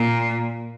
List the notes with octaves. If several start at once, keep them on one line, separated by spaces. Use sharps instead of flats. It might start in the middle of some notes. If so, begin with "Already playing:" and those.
Already playing: A#2